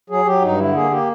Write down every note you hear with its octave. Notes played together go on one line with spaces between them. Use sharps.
F#3 G#4
F#3 G4
G2 D#4
D3 E4
A#3 G#4
A#3 G4